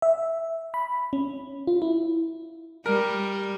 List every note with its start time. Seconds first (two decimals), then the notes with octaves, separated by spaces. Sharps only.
0.02 E5
0.74 B5
1.13 C#4
1.67 F4
1.82 E4
2.86 G3 A#4